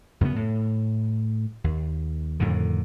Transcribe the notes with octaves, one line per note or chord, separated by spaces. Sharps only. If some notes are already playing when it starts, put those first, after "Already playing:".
F#2 C#3 A#3 B3
A2
D#2
F2 A2 D3 D#3